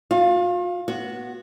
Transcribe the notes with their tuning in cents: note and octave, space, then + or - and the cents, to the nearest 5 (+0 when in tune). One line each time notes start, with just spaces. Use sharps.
F4 +45 F5 +0
B3 -25 F#4 +0